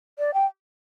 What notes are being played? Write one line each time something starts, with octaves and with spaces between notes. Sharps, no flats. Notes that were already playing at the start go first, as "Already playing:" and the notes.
D5
G5